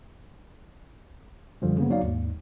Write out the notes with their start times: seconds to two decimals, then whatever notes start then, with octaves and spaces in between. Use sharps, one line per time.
1.62 F#2 D3 F3 G3
1.78 C#3 A#3 B3
1.90 F#3 D#4 D5 F5
2.02 D#2 G#2